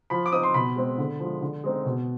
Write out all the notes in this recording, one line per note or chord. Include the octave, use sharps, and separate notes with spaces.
F3 B5
D6
C4 D#4 D#6
C6
B2 B5
G#3 C4
D3
F3 G#3
D3
G#3 C4 D#4
B2